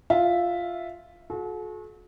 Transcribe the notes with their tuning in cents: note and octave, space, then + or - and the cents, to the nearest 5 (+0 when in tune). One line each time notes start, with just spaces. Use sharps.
F4 +0 E5 +0
F#4 -35 A4 -45